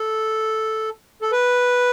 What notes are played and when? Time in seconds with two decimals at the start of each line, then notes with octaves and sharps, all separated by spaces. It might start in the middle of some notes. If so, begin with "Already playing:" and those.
Already playing: A4
1.22 A4
1.32 B4